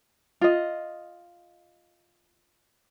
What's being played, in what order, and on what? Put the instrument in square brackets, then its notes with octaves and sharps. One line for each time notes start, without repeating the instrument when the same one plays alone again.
[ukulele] F4 D#5